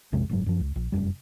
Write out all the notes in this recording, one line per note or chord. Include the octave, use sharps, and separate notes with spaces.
A#1 F2 C3 G#3
F#1 G#2 F#3
F#2 F3
C#2
A#1
F1 B1 F#2 G3